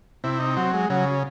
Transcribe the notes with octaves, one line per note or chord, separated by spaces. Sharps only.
C3 E4
D#4
F#3 C4
G#3
C#3 F#3